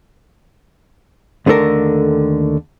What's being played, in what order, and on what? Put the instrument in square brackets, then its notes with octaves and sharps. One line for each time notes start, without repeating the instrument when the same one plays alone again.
[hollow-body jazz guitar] D#2 D3 A3 A4 A#4